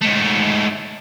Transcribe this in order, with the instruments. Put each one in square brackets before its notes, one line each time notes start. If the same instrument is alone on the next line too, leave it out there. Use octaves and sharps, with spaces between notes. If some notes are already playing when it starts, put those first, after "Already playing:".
[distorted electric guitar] G#2 A3